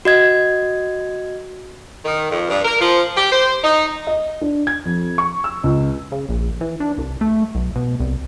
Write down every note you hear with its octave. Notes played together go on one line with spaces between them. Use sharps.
F#4 D#5 G#6
D#3
F2
G2
A#4
F3
G4
C5
D#4
D#5
D4
G#6
F2
C#6
E6
C#2
C#3
A#1
E3
D4
C2
A3
B1
B2
C2